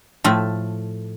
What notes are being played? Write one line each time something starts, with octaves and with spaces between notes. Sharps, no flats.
A2 F3 A3